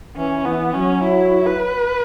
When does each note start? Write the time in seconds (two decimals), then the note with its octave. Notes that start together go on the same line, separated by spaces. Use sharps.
0.17 E3 C#4
0.45 E3 B3
0.73 F#3 C#4
1.03 E4
1.46 B4